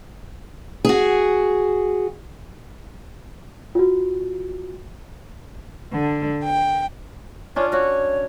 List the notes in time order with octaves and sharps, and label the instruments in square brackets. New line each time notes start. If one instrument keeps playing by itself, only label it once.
[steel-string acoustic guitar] F#4 G#4
[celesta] F4 F#4
[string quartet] D3
G5
[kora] C#4 D4 F4 [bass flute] C#5
[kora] F#4 [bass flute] C#5